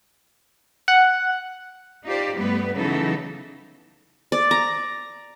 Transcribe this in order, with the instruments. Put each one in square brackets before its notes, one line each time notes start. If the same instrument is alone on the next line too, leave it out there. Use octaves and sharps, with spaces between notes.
[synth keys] F#5
[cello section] D#4 F4 G4 C5 D5
G2 G3 A3 B3 B4
C#3 E3 F#3 B3 D#4 A4
[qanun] D5
A#5